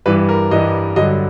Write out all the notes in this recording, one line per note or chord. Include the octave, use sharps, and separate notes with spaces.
G2 E3 G3 B4
A#4
G2 E3 G3 D#5
G2 D3 F#3 D#5